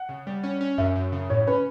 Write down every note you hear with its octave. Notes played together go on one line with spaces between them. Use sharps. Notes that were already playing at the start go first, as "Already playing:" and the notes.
Already playing: F#5
C#3
G3
C#4
C#4
F#2 E5
F#2
C#3
A2 C#5
C#4 B4